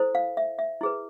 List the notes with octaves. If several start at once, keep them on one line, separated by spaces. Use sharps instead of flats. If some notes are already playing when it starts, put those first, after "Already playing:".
Already playing: E4 A4 C5
F5
E5
E5
E4 G#4 B4